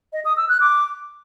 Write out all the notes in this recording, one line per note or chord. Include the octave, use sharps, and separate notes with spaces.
D#5
D#6
E6
F#6
D6